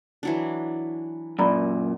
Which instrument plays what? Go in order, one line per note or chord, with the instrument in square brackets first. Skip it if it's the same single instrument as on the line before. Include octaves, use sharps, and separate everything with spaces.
[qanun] E3 F#3 D4
[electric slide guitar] F#2 A#2 [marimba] D5 A#5 B5